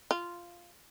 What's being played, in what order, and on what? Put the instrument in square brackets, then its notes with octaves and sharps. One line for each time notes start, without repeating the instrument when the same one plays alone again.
[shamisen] F4